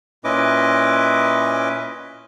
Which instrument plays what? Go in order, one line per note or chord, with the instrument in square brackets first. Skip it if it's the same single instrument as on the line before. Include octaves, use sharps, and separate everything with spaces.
[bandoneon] A#2 C#4 E4 B4 D#5 D6